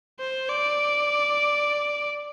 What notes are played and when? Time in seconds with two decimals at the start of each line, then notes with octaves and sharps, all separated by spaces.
0.19 C5
0.49 D5